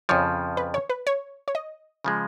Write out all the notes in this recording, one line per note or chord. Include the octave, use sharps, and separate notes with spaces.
F2 C#3 F3 C#5
B4
C#5
B4
C#5
C#5
D#5
C#3 F3 G#3